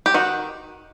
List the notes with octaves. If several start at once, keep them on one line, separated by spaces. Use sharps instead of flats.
G4
D#3 F#4